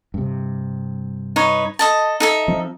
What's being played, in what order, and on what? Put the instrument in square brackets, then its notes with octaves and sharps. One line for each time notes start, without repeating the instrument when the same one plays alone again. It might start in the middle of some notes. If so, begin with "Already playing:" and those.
[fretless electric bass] G2 C3
[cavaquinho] D#4 B4 C#5
A4 D#5 A5
D#4 A4 E5
[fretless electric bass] F3 C4